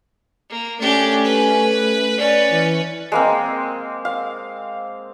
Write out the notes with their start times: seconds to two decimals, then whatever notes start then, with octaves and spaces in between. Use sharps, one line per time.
0.50 A#3
0.81 A3 C#4 D4 G4
1.24 B4
2.18 C#4 B4 D5
2.51 E3
3.12 G#3 A#3 C4
4.05 F5